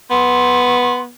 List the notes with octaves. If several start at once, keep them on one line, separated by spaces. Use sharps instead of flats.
B3 C6